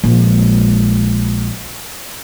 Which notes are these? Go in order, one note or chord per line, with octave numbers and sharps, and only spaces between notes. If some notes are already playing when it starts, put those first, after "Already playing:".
A#1 G#3